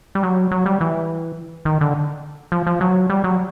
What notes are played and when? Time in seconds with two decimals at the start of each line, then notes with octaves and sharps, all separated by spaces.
0.15 G3
0.23 F#3
0.51 F#3
0.66 G3
0.81 E3
1.65 D#3
1.81 D3
2.52 F3
2.67 F3
2.81 F#3
3.10 G3
3.24 F#3